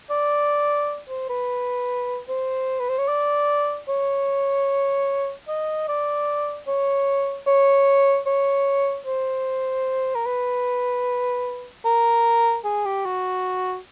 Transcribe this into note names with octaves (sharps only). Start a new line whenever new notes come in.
D5
C5
B4
C5
B4
C5
C#5
D5
C#5
D#5
D5
C#5
C#5
C#5
C5
A#4
B4
A#4
G#4
G4
F#4